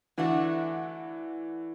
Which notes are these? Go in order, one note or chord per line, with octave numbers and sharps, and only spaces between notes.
D3 E3 A3 D4 F#4